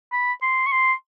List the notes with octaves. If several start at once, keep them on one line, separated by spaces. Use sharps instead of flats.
B5
C6
C#6
C6